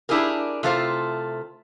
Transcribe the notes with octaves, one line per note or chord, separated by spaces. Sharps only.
D4 E4 G4 G#4 A#4
C3 A3 F4 C5